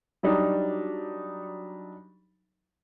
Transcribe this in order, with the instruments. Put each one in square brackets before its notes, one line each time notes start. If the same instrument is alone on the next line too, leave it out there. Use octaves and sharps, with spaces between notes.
[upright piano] F#3 G3 D4 D#4